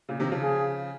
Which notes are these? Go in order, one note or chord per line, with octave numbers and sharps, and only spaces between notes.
A#2 C#3
C3 D#3
C#3 F3
G#4